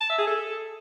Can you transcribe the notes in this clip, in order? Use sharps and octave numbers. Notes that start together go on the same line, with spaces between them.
A5
E5
G#4
A4